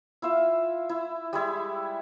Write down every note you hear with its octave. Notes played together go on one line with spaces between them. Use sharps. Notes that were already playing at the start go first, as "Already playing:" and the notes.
E4 F4 E5 F5
E4
G3 G#3 E4